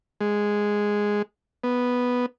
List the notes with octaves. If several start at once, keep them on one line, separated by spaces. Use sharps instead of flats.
G#3
B3